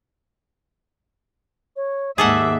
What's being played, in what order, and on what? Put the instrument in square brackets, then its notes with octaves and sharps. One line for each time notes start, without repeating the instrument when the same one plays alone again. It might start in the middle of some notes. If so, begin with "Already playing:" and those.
[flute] C#5
[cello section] D#2 G#2 E5 [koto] G#4 A4 F#5 [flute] D6